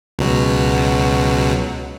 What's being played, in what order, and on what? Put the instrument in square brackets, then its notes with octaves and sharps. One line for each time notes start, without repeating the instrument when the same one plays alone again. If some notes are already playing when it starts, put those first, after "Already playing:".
[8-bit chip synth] C#2 B2 F#3